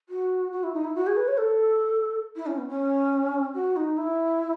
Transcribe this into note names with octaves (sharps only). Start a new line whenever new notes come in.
F#4
F#4
E4
D#4
E4
F#4
G#4
B4
C#5
A4
E4
C#4
B3
C#4
F#4
D#4
E4